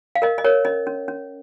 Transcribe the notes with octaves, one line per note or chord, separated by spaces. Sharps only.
F5
A#4 D#5
D#5
A#4 C#5
C#4 D#5
C#4
C#4